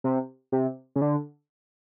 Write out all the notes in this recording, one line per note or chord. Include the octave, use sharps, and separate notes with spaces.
C3
C3
C#3
D3